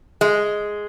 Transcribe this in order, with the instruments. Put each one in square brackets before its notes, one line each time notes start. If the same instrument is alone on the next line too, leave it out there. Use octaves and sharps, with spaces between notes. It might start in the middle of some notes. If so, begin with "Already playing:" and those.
[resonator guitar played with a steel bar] G#3